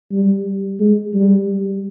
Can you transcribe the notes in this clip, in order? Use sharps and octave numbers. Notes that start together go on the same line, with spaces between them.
G3
G#3
G3